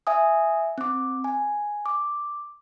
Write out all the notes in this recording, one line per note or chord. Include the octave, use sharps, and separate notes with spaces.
E5 G#5 D#6
C4 D6
G#5
D6